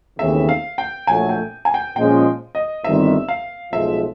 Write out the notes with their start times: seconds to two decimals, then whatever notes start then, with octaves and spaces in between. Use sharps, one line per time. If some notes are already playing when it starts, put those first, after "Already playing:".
0.19 D#2 C#3 E3 A3 C4 E5
0.49 F5
0.78 G5
1.07 A#1 A2 F#3 A3 G#5
1.29 G5
1.65 G#5
1.74 G5
1.96 A#2 F3 G#3 C#4 G5
2.55 D#5
2.84 G1 G2 D#3 G3 C4 E5
3.28 F5
3.72 B1 A2 F3 G#3 E5